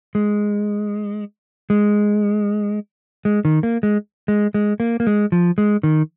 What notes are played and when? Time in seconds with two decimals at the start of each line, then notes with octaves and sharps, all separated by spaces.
0.15 G#3
1.70 G#3
3.25 G#3
3.45 D#3
3.63 A#3
3.83 G#3
4.28 G#3
4.54 G#3
4.80 A#3
5.00 A#3
5.07 G#3
5.32 F3
5.58 G#3
5.83 D#3